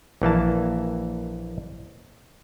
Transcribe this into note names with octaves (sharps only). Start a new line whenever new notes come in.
A#1 E3 A#3 A5